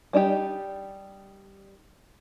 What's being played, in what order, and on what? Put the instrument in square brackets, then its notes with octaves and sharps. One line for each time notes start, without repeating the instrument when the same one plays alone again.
[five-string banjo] G3 D4 D#4 G4